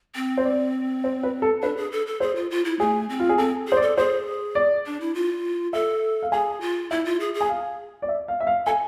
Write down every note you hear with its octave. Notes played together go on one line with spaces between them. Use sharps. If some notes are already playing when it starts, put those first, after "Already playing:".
C4
C5
D5
C5
B4
A4
D4 B4
G#4
A4
A4
G#4 C5
F4
F4
E4
A3 G#4
C4
F4
G#4
C4 A4
G#4 C5
D5
A4
G#4 C5
D5
D4
E4
F4
A4 E5
F5
G#4 G#5
F4
E4 E5
F4
G#4
G#4
G#5
F5
D5
E5
F5
E5
F5
A4 G#5